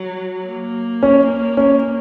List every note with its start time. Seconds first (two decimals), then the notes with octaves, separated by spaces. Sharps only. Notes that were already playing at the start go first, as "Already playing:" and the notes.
Already playing: F#3
0.47 A#3
1.03 C#4
1.57 C#4